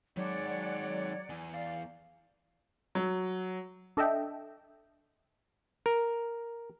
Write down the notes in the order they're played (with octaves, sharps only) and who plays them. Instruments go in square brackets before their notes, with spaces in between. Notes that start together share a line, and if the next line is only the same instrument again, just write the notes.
[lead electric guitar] D#3 G#3 [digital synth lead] F#3 [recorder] C#5 [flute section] D5 F#5
[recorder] C#5
[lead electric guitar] E2 [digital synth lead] G#5
[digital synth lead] D5 [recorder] F5
[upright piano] F#3
[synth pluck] D4 A4 D#5 E5 G5
[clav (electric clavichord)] A#4